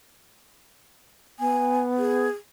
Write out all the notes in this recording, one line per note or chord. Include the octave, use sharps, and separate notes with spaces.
B3 G#5
G#4